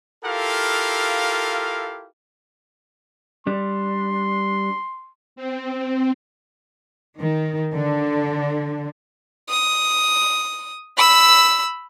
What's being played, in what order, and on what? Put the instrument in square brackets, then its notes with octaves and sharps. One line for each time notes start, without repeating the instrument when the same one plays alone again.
[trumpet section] E4 F4 G4 A4 A#4 F5
[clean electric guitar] G3 D4 [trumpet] C6
[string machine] C4
[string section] D#3
D3
[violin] D#6
B5 E6